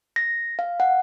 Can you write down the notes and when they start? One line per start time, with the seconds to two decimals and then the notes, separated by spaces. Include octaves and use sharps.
0.16 A#6
0.59 F5
0.80 F#5